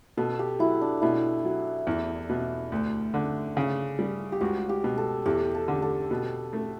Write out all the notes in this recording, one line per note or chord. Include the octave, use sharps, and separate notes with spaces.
B2 A4
G4
F#3 E4
D4
B2 E4
F#3
E2
B2
D2
D3
C#3
G3
G4
C#2 F#4
G4
B2
A4
E2 G4
A4
D3
A4
B2
A3